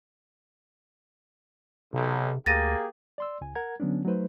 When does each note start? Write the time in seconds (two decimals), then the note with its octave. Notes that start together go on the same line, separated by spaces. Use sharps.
1.93 B1 C3
2.46 D2 A#3 G4 G#4 A6 A#6 D#7
3.18 D5 C6 E6
3.41 C#2 G#5
3.55 A#4 F#5 A#5 G#6
3.80 D3 F#3 B3 C#4 D4
4.05 F#3 A3 D#4 B4 C5